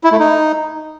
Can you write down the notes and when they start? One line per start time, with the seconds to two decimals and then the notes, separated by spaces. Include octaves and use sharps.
0.04 E4
0.12 A3
0.20 D#4